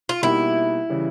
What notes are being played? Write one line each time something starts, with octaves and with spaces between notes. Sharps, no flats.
F4
B2 G3 A#3 D#4 E4 G4
C#3 E3 G3